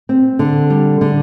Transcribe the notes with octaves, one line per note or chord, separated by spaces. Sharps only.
C4
D3
G3
D3